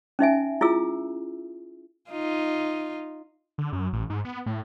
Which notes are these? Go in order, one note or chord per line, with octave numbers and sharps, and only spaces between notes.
C#4 D#4 E5 G#5
E4 F4 G#4 E6
D#4 F4
D3
F#2
A1
G#2
B3
A2